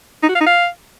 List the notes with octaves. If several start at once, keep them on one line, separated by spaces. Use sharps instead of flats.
D#4
F#4
F5
D#4
F5